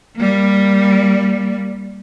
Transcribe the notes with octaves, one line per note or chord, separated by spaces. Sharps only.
G3 A#3